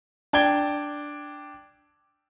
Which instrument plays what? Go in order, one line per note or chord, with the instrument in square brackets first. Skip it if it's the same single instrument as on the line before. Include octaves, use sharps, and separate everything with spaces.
[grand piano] D4 G5 G#6 G7